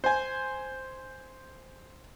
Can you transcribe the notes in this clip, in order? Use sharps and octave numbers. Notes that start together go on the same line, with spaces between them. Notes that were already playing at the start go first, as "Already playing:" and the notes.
C5 G#5